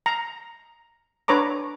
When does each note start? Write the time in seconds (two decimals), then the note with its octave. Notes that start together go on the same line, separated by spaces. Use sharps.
0.06 A#5
1.28 D4 B4 C#5 A#5 D6